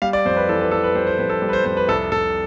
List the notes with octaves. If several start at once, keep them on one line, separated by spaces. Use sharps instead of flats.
G3 F5
D5
F2 C5
B4
E3 A4
B4
E3 A4
B4
G3 C5
C5
F2 B4
A4
G3
B4
C5
F2 C5
B4
C2 A4
C2 A4